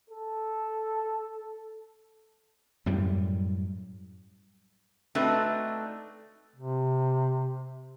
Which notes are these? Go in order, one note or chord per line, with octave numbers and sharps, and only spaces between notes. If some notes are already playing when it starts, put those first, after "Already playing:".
A4
F#2 A2 G3
A3 C4 D4 D#4 F#4 B4
C3